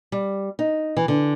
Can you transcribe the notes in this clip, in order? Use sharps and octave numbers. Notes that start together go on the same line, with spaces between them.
G3
D#4
E3
D3